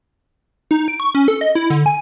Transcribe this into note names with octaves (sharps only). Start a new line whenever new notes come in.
D#4
D7
C#6
C#4
A4
D#5
E4
D3
G#5